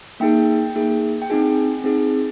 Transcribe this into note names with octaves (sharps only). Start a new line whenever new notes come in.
A#3 D#4 G#4 G5
A#3 D#4 G#4
G5
C4 D#4 G#4 G#5
C4 D#4 G#4